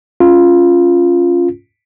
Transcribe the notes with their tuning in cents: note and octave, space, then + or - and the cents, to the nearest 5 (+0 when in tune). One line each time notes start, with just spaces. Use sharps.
C#4 +0 F4 +0